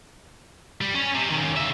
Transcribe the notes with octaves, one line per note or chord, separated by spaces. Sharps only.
G3
C#4
C3
D#3 C#4
C#3 E5